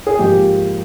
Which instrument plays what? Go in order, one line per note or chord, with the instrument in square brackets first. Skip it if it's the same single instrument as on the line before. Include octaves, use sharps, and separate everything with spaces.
[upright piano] G#4
G#2 F3 A#3 G4